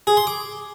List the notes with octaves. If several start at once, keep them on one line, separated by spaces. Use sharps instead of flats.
G#4
C6
D6